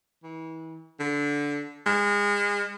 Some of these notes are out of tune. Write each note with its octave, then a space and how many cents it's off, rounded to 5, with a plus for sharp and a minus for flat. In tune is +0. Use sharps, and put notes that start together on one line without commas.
E3 -35
D3 -15
G#3 -30